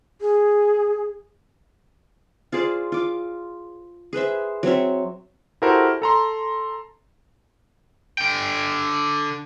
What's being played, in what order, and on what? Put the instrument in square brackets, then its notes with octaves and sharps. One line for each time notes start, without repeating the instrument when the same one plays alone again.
[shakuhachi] G#4
[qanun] F4 G#4 C5 D5
F4 D6
G#4 B4 C5 E5
F#3 C4 C#5 E5
[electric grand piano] E4 F#4 G4 A4 A#4 C5
A4 A#5 C6
[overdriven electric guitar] D3 G5